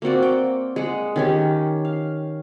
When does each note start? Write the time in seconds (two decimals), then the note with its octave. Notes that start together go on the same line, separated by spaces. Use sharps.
0.02 A#3 C4 F#4 D5
0.22 G5
0.76 G#3 F#5
1.16 D#3 C#4 G4
1.85 F5